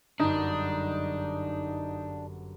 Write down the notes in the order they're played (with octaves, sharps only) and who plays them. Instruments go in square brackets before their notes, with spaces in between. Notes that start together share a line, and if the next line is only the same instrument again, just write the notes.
[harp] G1 F#2 [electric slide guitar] D4 [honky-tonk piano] D#4